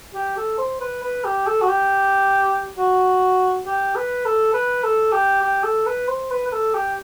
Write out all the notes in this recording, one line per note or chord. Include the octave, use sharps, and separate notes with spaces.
G4
A4
C5
B4
B4
G4
A4
F#4
G4
F#4
G4
B4
A4
B4
A4
G4
G4
A4
B4
C5
B4
B4
A4
G4